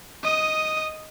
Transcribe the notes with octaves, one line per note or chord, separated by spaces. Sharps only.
D#5 D#6